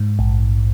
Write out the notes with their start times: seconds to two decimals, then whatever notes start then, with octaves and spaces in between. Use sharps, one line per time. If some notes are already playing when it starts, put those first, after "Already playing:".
Already playing: G#2
0.19 A#1